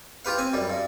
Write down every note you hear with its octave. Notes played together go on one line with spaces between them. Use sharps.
F4 G4 B4 F5
C4 G#5
F#2 G3
G2